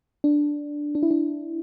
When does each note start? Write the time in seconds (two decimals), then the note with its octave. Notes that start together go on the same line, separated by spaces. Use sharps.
0.24 D4
0.95 D4
1.03 E4
1.11 D4